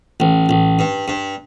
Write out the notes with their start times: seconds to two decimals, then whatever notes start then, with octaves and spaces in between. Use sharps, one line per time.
0.20 A1
0.49 A1
0.79 G2
1.08 G2